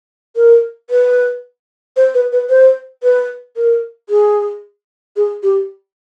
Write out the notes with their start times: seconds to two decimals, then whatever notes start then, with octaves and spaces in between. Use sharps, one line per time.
0.36 A#4
0.90 B4
1.97 C5
2.14 B4
2.32 B4
2.50 C5
3.03 B4
3.57 A#4
4.09 G#4
5.16 G#4
5.43 G4